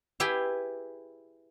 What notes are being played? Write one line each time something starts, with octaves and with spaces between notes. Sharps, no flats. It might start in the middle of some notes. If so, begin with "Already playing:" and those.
E4 G4 G#4 B4 G5 G#5